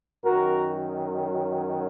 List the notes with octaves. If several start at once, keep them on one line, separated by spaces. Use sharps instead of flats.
F#2 D#3 F#3 F#4 A#4